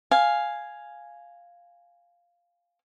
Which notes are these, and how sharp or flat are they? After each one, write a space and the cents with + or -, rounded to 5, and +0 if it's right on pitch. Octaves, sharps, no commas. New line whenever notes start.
F5 +0 G#5 +0